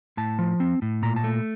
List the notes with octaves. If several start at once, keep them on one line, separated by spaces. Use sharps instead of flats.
A2 A5
F3
C4
A2
A#2 A#5
A5
A3